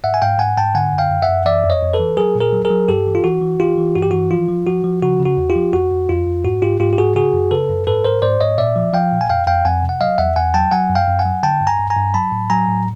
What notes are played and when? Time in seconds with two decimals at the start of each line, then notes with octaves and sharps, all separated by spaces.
0.04 G#2 E5 F#5
0.14 G#5
0.22 G#2 F5 G5
0.39 G#2 F#5 G#5
0.57 G#2 G5 A5
0.75 D3 F#5 G#5
0.93 F#2
0.98 F5 G5
1.11 F#2
1.22 E5 F#5
1.28 F#2
1.45 E3 D5 E5
1.64 F2
1.70 C#5 D#5
1.82 F2
1.93 A4 B4
1.99 E3
2.17 F#3 G#4 A#4
2.35 A#2
2.40 G#4 A#4
2.53 F#3
2.65 G#4 A#4
2.71 F#3
2.88 G2 G4 A4
3.06 E3
3.15 F4
3.24 E3 F#4
3.42 E3
3.59 E3 F4 G4
3.78 E3
3.95 G2 F#4
4.03 G4
4.11 E3 F#4
4.31 F3 F4
4.48 F3
4.67 F3 F#4
4.84 F3
5.02 C#3 F#4
5.20 C#3
5.25 F#4
5.37 E2
5.50 F4 G4
5.56 F3
5.73 F2 F#4
5.91 F2
6.09 F2 F4
6.26 F2
6.44 G#2 F#4
6.62 G#2 F4 G4
6.80 G#2 F4 G4
6.93 G4
6.98 G#2 F#4 G#4
7.15 C#3 F#4 G#4
7.34 F#2
7.51 C#3 A4 B4
7.69 F#2
7.87 G#2 A4 B4
8.04 G#2 A#4 C5
8.22 G#2 C5 D5
8.41 G#2 C#5 D#5
8.58 A#2 D5 E5
8.76 F3
8.93 F3 F5 G5
9.12 A#2
9.21 G#5
9.29 F2 F5 G5
9.47 F2 F5 G5
9.65 F2 F#5 G#5
9.83 C3
9.89 F#5
10.01 F#3 D#5 F5
10.18 E2 E5 F#5
10.36 E2 F#5 G#5
10.54 F#3 G5 A5
10.71 F#3 F#5 G#5
10.90 F#2
10.95 F5 G5
11.08 F#2
11.19 F#5 G#5
11.26 F#3
11.43 D3 G5 A5
11.61 G2
11.67 G#5 A#5
11.79 G2
11.90 G#5 A#5
11.96 G2
12.14 F#3 A5 B5
12.32 A2
12.50 F#3 G#5 A#5
12.68 A2